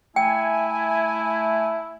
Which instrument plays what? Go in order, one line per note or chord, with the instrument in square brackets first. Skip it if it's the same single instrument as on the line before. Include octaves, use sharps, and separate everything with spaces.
[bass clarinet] A3 [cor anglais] E4 [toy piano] G5 [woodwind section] G#5